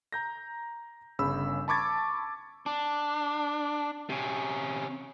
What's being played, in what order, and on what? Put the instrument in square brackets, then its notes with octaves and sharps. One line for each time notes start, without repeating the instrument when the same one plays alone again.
[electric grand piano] A#5 G6 A#6
G1 C#3 B5 E6
A5 B5 C#6 D6 G#6 A6
[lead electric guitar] D4
C3 C#4